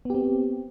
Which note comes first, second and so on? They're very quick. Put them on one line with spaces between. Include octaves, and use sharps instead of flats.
B3 G4 C4